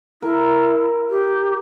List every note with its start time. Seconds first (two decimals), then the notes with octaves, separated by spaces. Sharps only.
0.22 E4 A#4
1.10 G4